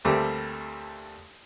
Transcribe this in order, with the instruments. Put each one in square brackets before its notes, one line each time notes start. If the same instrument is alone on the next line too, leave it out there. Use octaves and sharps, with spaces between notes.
[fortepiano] D2 G3 A3 A#3 C4 D6